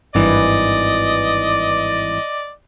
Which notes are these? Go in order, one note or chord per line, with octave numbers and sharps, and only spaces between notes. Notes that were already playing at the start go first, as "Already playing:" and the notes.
G#1 G2 E3 D5 D#5